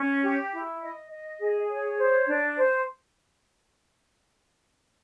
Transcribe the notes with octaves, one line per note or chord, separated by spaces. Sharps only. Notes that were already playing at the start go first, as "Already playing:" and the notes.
Already playing: C#4
G4
E4
D#5
D#5
G#4
C#5
C5
D4
C5